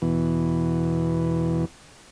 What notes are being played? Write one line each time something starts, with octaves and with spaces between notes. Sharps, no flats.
E2 B2 E3